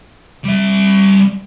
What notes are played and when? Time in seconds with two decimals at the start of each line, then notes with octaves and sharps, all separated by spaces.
0.45 G3 E5